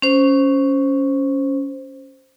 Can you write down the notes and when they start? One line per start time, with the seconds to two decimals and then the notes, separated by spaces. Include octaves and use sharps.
0.02 C#4 C5